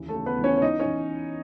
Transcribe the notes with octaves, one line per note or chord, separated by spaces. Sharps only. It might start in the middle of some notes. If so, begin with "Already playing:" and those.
Already playing: D#2 C#3 E3
A3 A4
C#3
B3 B4
E3
C#4 C#5
C#5
E3 D#4 D#5
C#4 C#5
E3